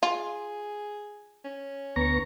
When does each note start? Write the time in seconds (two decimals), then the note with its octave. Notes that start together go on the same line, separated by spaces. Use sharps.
0.03 F4 G#4
1.44 C#4
1.96 D2 B3 A#5 C#6